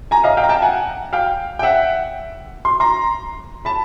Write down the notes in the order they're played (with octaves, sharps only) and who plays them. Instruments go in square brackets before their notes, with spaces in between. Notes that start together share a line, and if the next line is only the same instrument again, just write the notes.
[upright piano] G#5 A#5
D#5 F5
F5 G5
A#5
G5 A5
F#5 G#5
F5 G5
G5
E5 F#5
C6
A#5 C6
A5 B5